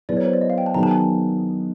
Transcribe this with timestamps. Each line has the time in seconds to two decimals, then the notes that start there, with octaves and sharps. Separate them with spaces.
0.09 F#3 B3 E4 G#4 B4 D5
0.17 C#5
0.25 C5
0.33 D5
0.41 D#5
0.50 F5
0.58 G5
0.66 A5
0.74 D#3 F#3 B3 D#4 G#4 A#5
0.83 A5
0.91 G#5